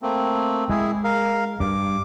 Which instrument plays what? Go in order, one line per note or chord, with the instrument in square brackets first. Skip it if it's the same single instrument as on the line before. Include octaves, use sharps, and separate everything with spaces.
[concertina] A3 A#3 C4
[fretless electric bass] G#3 [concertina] E4 G#4
[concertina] A#4 F5
[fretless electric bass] G2 [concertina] D6